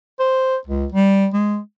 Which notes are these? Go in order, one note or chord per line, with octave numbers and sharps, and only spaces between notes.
C5
C#2
G3
G#3